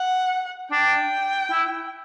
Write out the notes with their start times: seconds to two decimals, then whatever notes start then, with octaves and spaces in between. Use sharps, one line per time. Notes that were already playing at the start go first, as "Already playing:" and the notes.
Already playing: F#5
0.71 D4 G5
1.52 E4